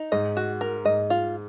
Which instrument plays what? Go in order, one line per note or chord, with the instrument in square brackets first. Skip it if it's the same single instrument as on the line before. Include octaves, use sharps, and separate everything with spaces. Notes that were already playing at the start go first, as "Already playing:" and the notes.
Already playing: [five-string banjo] D#4
[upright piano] G#2 [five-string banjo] D#5
[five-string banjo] F#4
A#4
[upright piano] G#2 [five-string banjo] D#5
[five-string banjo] F4